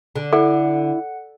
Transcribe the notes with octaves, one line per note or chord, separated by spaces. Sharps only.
D3
E4 A4 F#5